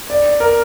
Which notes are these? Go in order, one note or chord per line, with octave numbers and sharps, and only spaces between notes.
D5
A#4